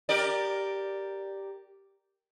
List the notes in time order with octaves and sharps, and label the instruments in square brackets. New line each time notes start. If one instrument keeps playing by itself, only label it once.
[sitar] G4 A#4 D5